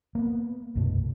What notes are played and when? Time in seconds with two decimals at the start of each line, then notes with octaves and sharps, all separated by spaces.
0.15 A#3 B3
0.75 C2 F#2 B2 A3